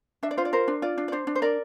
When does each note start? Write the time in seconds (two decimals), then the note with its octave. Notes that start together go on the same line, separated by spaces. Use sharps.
0.23 D4 E5
0.31 D5
0.37 F4 C5
0.45 D5
0.53 A#4 C5
0.68 D4
0.82 F4 D5
0.98 D4
1.08 D5
1.12 D4 C5
1.27 D4
1.35 C5
1.42 A#4 D5